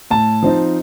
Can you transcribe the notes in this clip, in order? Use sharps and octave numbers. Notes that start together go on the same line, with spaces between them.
A2 A5
F3 C4 D#4